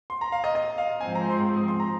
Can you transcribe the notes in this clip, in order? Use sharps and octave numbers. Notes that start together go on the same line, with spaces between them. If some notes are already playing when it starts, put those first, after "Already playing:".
C6
A#5
F5
D#5
D#5
F5
G#2 F3 C4 G#5
A#5
C6
D#6
C6
A#5